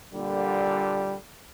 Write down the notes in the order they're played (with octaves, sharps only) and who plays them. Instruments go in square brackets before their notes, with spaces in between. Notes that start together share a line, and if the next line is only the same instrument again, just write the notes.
[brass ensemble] A#2 D3 [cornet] G3